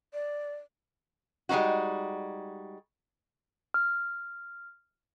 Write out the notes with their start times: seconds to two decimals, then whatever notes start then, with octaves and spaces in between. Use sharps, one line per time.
0.14 D5
1.49 G3 G#3 C4 D#4 F#4
3.74 F6